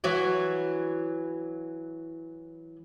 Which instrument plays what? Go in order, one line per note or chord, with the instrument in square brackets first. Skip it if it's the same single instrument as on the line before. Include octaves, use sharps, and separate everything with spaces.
[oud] E3 F#3 F#4